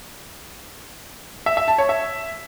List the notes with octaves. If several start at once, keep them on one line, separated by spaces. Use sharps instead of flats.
E5
E5
A5
C#5
E5